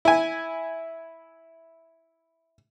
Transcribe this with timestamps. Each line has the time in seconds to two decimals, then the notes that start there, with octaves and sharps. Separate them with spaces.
0.05 E4 G#5